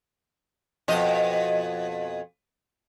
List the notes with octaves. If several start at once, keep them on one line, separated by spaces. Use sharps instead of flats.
F2 B2 D#5